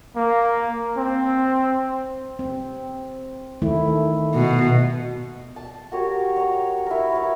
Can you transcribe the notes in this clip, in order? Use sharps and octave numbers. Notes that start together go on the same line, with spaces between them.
A#3
C4
C4
D#3 A3 E4
B2
A5
F#4 G4 A#4 C#5
C#5 A#5
E4 A#4
B4 C#5